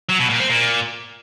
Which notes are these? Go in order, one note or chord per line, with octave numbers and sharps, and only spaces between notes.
F#3
B2
A#2
C4
A#2